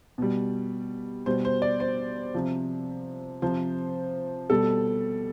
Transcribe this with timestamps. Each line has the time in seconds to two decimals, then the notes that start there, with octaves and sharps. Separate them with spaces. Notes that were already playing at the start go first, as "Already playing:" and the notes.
0.18 B2 G3
1.26 B2 G3 C5
1.45 C5
1.62 D5
1.80 C5
2.34 C3 F3
3.42 C3 F3 C5
4.50 B2 G3 A4